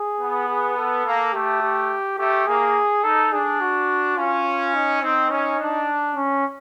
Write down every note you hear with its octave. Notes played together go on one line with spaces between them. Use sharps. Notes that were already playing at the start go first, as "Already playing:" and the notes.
Already playing: G#4
B3
G#4
A4
A#3
A3 G4
G4
A3 G4
A#3 G#4
D#4 A4
D4 G#4
F#4
C#4 F4
D#4
C4 D#4
C#4
D4
C#4